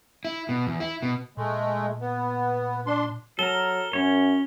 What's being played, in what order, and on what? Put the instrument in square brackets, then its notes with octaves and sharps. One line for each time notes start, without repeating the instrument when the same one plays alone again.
[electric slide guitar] E4
B2
E2
E4
B2
[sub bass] A#2 [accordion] G#3 A3
[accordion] B3
D4 C6
[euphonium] F#3 [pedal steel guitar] A4 A#4 [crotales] G7
[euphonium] F#2 [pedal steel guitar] C#4 C#5